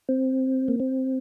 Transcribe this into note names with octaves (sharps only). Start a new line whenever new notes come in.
C4
A#3
C4